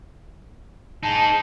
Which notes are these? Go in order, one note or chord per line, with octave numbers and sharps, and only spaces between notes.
D#4 G#4 A5